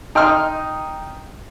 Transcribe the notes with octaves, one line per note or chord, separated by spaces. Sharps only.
D#4 G5 C6 F6